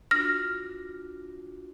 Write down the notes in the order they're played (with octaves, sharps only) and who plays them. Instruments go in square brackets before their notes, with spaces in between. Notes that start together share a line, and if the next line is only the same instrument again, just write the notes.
[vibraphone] D4 F4 F#4 [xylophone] F6 A#6